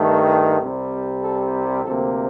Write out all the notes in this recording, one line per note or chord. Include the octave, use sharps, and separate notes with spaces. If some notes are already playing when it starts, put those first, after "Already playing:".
Already playing: G2 D#3 A3
C2 C3 G3
A4
D2 C3 F3 A#3 A4